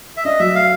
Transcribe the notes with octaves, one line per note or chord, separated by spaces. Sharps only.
E5
D4 D#5
F#3 E5
A3 F5